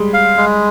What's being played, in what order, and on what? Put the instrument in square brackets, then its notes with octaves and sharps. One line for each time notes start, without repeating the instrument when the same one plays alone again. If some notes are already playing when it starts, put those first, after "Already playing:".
Already playing: [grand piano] G3 G#3
[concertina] F5
G#3